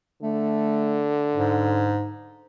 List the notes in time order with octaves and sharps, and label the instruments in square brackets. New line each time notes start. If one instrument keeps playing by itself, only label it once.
[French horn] D3 [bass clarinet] A3
[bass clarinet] G#2